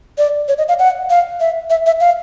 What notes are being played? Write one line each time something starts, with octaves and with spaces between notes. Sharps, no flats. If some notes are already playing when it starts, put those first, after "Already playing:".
D5
C#5
D#5
F5
F#5
F5
E5
E5
E5
F5